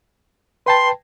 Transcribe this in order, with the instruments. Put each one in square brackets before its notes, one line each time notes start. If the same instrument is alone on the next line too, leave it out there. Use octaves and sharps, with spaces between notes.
[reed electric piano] B4 G5 A5 [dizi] C6